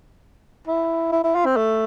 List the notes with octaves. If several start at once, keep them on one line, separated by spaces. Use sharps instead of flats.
E4
E4
E4
F4
C4
A3